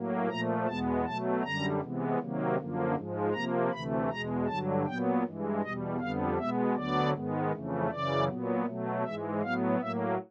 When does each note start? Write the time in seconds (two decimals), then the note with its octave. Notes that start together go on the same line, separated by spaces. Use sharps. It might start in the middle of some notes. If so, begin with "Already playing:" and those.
Already playing: A2 F#3 A#3
0.29 A#2 F3 A3 A#5
0.66 E2 B2 G#3 B3 A5
1.05 B2 F#3 A3 A5
1.43 F#2 D3 G3 A#5
1.81 C3 E3 G#3 B3
2.20 C3 D#3 F#3 A#3
2.58 F#2 D3 F3 A#3
2.96 G#2 F3 G#3
3.33 C3 F3 A#3 A#5
3.71 D2 C3 E3 A3 B5
4.09 E2 B2 G#3 A#5
4.47 G2 D3 F#3 A5
4.86 A#2 F#3 B3 G5
5.24 G2 E3 G#3
5.62 E2 B2 G3 D#5
6.00 F2 D3 G3 B3 F5
6.38 B2 G#3 B3 E5
6.76 D2 D3 F#3 B3 D5
7.13 G#2 D#3 G#3 B3
7.51 F2 C#3 E3 A3
7.90 F#2 C#3 E3 D5
8.28 A#2 F#3 B3
8.66 B2 F#3 A3
9.04 G#2 E3 G#3 E5
9.42 A2 F#3 B3 F5
9.80 A2 F#3 A#3 E5